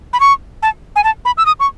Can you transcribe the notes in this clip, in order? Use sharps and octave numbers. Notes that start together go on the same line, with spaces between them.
B5
C#6
A5
G#5
A5
B5
E6
D#6
C#6